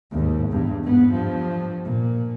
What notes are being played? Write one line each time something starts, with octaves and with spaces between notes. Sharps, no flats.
D#2 G#2
E2 G2
G#2 B3
G2 F3
A#2